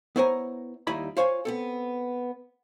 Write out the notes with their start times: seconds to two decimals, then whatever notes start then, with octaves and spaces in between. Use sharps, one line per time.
0.16 B3 E4 C5 C#5 G#5 A#5
0.87 D#2 G3 D#4 E4 D#5 B5
1.17 F4 C5 C#5 F5 G#5
1.45 B3 C4 A4